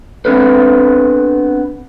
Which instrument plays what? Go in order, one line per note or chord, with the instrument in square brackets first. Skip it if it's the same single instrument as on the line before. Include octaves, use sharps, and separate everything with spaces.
[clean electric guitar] B3 C4 D4 A4 B4